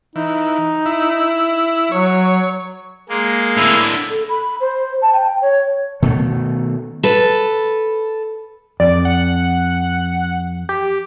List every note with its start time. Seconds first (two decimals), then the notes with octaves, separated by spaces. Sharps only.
0.16 E3 D#4
0.86 E4
1.92 F#3 C#5
3.09 G#3 A#3
3.57 A2 D3 E4
4.10 A4
4.29 B5
4.60 C5
5.02 A5
5.13 G5
5.41 C#5
6.02 B2 D#3 A3
7.03 A4 B4
8.80 F2 D5
9.05 F#5
10.69 G4